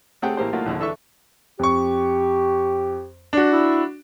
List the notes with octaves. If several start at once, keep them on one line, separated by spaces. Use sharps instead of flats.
A3 C4 G4 G#4 F#5 G5
A1 A#3 G4 C5
F#3 A3 A#3 D#4 F4 F#4
A#1 D#2 D3
E3 D4 A4 E5 C#6
F2 G4 C#6
D4 F#4
E4